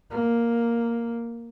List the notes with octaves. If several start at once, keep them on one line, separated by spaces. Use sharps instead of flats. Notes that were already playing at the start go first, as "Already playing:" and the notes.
A#3